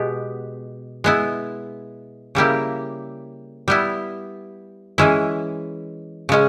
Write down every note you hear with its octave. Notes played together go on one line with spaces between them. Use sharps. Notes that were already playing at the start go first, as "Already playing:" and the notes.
Already playing: B2 G#3 B3 G4
G#3 B3 E4
C#3 G3 A#3 E4 G4
G3 B3 E4
E3 G#3 C#4 E4
C#3 G#3 C#4